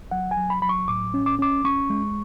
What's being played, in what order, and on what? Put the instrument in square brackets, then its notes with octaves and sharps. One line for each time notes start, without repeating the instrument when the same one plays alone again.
[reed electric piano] F#3 F#5
G#5
F#3
B5
F#3 B5
C#6
A2 D6
C#4
D6
C#4 D6
C#4 C#6
G#3